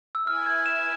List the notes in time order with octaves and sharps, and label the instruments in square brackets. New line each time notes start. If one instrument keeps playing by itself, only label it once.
[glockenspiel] E6
[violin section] E4 B4 E5 G#5 [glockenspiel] F6
[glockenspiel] G#6
E7